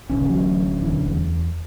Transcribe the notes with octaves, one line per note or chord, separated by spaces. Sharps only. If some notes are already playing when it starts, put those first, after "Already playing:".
D1 B1 C#3 C#4
A1 F#3
E1 D3 E3
E2